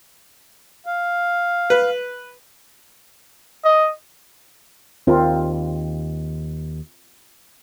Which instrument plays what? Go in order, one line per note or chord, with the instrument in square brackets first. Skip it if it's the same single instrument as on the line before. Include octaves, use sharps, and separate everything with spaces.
[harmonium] F5
[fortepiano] B4
[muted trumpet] D#5
[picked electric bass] D#2 [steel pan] C4 F4 A#4